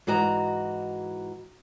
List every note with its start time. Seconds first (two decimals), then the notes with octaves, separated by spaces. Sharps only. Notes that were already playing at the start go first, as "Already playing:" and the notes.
0.07 G#2 E3 F#4 D#5 A#5